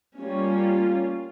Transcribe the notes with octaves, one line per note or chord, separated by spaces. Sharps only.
G3 A#3 C#4 F4